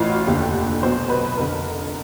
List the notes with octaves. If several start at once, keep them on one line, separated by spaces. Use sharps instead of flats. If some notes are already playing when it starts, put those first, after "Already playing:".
Already playing: A1 A2 E3 F4
F#4
F1 D#2 D3 G4
B1 B2 C5
B4
F1 F2 D3 A#4